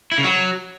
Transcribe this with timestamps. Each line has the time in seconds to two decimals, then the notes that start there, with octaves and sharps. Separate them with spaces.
0.12 E4
0.18 C#3
0.24 F#3